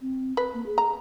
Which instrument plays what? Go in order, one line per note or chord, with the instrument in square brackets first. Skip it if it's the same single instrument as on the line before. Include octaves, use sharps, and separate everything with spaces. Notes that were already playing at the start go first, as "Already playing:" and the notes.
[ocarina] C4
[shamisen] B4
[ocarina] A#3
G#4
[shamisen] A#5